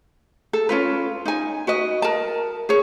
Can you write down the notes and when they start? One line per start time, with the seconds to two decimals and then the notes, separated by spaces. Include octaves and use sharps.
0.53 A4
0.69 C#4 F4 B4
1.25 D#4 G#5
1.67 F#4 B4 D#5
2.02 A#4 A5
2.69 G#4 C#5